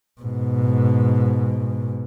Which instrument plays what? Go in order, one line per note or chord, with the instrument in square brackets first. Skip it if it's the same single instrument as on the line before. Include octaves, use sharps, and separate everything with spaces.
[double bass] G#2 B2